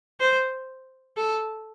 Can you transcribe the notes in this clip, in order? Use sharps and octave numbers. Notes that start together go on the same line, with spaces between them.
C5
A4